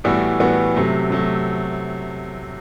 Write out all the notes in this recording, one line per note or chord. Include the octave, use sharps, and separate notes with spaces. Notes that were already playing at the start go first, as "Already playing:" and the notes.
A2 E3 G3 B3 F#4
A2 E3 G3 B3 F#4
C3 F#3 A3
C3 F#3 A3